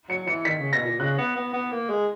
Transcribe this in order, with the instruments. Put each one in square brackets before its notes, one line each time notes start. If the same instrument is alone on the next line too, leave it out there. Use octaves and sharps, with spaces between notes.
[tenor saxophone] F#3 [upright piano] C#7
[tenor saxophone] E3 [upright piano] C#7
[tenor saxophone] D#3 [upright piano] B6
[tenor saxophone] C#3
[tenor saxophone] B2 [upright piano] A#6
[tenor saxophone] A#2
[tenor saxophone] C#3 [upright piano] F#6
[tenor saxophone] B3
B3
B3
A#3
G#3